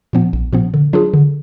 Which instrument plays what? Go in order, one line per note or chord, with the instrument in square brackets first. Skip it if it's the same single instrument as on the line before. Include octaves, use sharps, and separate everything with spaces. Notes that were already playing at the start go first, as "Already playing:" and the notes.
[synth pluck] A#2 F3 B3
A#1
A#2 F3 B3
D3
F#3 D4 F4 G#4
D3